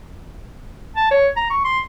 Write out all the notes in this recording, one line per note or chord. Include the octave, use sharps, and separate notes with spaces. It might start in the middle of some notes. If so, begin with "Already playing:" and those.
A5
C#5
A#5
C#6
C6